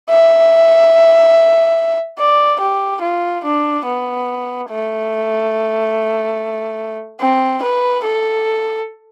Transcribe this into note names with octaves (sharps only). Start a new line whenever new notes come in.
E5
D5
G4
F4
D4
B3
A3
C4
B4
A4